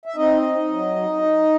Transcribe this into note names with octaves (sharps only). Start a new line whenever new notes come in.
E5
C4 D#4 D#5
D#4
F#3
D#4
D#4